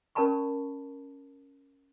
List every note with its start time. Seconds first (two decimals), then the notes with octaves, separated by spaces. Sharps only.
0.15 C#4 A#4 D5 A5 B5 C#6